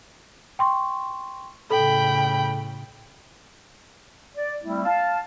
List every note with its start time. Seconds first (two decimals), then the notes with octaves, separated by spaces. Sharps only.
0.59 G5 C6 C#6
1.70 A2 C#3 A4 G5 B5
4.34 D5
4.63 G3 A3 C4 E4
4.85 F5 A5